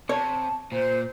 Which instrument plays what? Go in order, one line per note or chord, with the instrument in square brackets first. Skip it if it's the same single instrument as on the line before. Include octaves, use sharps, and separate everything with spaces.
[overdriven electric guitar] C3 [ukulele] C#5 [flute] A5
[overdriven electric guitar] A#2 [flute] C5